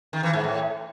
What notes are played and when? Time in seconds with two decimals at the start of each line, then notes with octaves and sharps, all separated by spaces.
0.13 D#3
0.23 E3
0.33 G#2
0.44 A2